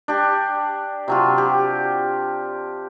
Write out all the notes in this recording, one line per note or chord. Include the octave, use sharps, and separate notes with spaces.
D4 G4
C3 F#3 F4
G4